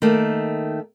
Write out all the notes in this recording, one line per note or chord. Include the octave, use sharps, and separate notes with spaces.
D#3 A3 A#3